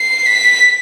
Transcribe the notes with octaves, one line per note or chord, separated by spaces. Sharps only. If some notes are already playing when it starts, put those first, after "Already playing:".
Already playing: C7
B6